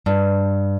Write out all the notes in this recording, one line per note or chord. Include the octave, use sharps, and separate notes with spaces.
G2